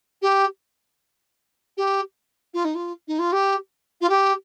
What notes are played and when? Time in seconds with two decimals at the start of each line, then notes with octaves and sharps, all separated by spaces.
0.22 G4
1.77 G4
2.54 F4
2.65 D#4
2.75 F4
3.08 D#4
3.19 F4
3.32 G4
4.01 F4
4.09 G4